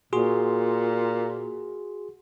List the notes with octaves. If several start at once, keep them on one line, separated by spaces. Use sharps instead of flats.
A#2 F#4 G#4 C6